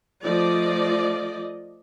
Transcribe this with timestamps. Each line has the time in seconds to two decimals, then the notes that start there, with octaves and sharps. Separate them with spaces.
0.24 F3 A3 D5 D#5